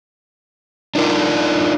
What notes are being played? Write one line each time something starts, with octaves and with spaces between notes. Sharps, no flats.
D4 D#4 F4 A#4 D5